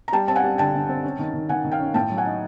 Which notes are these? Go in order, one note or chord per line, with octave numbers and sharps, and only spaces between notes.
A#5
G3 G5 A5
C4 A5
F#5 G#5
G3
D3 G5 A5
D3
C4
C#4
D#3
D#3
D#3 F#5 G#5
D#3
F5 G5
C#4
A2 G5 A5
F#3
F#5 G#5
D#4